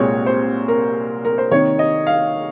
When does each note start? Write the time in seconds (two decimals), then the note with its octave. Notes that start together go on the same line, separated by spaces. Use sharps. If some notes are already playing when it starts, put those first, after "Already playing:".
Already playing: C2 A#2 G#3 C4 C#5
0.26 C5
0.68 A#4
1.25 A#4
1.38 C5
1.51 C3 D#3 A#3 C#5
1.79 D#5
2.07 F5